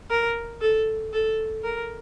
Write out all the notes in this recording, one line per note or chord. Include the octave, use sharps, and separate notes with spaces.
A#4
A4
A4
A#4